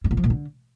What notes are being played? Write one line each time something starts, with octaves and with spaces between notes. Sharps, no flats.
G2
A2
F3
A#2
D3